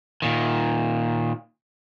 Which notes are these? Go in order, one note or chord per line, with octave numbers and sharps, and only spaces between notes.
A#2 D#3